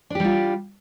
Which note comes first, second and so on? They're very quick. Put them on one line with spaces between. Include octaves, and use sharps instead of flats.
D4 G4 G3 F4